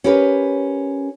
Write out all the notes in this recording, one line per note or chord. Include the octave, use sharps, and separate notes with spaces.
C#4 G4 A#4 B4